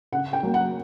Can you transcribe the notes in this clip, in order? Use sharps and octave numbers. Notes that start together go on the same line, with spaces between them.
C#3 F#5
G5
F#3 A#3
F#5